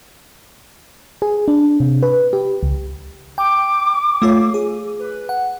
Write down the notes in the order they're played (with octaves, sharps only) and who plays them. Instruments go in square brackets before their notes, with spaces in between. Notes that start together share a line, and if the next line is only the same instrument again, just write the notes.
[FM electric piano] G#4
D4
C3
B4
G4
C#2
[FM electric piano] G5 [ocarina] D6
[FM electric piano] A3 F4 C#5
G#4
[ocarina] B4
[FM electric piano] F#5